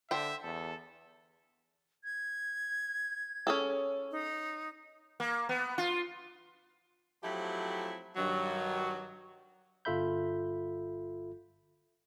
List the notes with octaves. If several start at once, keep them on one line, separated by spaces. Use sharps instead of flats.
D3 C5 E5 G5
E2 A4
G#6
C#4 G#4 A4
D#4
A#3
B3
F4
F3 F#3 A3 C4 E4 G4
G2 D#3 F#3
G1 F4 A4 E5 B5 G6